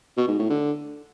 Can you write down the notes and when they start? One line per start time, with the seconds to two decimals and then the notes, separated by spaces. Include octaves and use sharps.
0.17 B2
0.28 G#2
0.39 A2
0.50 D3